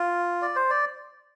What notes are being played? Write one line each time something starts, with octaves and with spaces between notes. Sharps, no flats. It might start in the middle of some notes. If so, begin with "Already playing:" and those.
Already playing: F4
D5
C5
D5